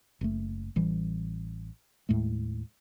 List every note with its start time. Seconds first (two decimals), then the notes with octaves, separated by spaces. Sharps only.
0.21 F#1 A3
0.76 A1 E3 G3
2.09 D#2 A2 G#3 A3